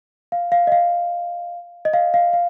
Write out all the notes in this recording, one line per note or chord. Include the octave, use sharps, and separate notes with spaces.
F5
F5
D#5
F5
D#5
F5
F5
F5